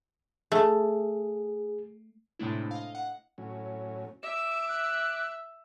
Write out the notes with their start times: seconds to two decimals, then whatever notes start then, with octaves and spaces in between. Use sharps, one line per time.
0.52 A3 G#4
2.39 A2 C3 G#3 A3 D4 E4
2.71 D#5 F5
2.95 F#5
3.38 A2 F#3 C#4
4.23 E5 D6 E7
4.69 F#6